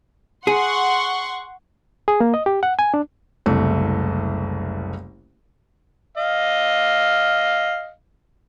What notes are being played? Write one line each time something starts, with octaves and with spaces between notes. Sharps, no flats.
G#4 F#5 C6 C#6
G#4
A#3
D#5
G4
F#5
G#5
D4
F#1 C2 A3
D#5 F5